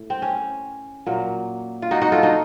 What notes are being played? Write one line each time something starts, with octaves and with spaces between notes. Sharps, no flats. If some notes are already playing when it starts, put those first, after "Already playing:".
Already playing: A2
C4
C#4
A#2 F#3 A#3
F4
D#4 F#4
D#4 F#4
F4 A4
D#4 F#4